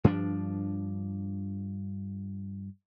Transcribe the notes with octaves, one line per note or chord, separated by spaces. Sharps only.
G2 F3 D4